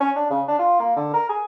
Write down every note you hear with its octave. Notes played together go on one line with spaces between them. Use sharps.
C#4
D4
C#3
D4
F4
A#3
D3
A#4
G#4